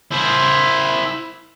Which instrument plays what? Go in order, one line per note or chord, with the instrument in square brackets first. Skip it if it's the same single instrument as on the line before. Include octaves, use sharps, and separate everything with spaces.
[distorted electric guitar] E4 C5